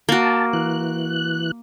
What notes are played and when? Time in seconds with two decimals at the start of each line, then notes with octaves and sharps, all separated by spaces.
0.09 A#3 F#4 A5
0.53 E3 F#6